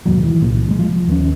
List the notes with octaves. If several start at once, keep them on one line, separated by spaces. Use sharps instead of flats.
E1 D#2 G#2 F#3
E3
C2 A#2
G2 G#3
F3
D#2 A3 C#4